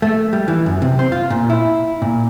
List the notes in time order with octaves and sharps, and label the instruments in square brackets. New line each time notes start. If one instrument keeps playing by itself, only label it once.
[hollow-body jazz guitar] A3
G3
E3
F#2
C3
C5
F4
A#2
E4
A#2